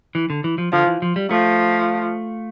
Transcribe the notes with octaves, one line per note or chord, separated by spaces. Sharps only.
E3
D3
E3
F3
D3 F3
E3
F3
G3
F3 A3